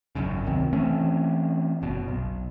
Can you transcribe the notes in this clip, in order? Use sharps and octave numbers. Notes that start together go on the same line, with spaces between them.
G#1 F#2 C#3
C#2 C3 D#3 C4
E3 A3 C4 C#4
F#1 B2
B1